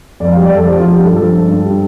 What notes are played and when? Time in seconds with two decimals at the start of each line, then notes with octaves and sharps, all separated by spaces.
0.20 F2 D5
0.32 F5
0.37 G3
0.45 D5
0.53 F2 A4
0.67 F3 G4
0.80 F4
0.83 F3
0.93 G4
0.99 G2 A4
1.15 F3 A4
1.31 G2
1.48 G2
1.64 G3